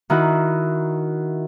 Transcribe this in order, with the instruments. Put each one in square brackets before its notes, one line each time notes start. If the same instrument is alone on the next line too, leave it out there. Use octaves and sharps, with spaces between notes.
[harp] D#3 E4 F#4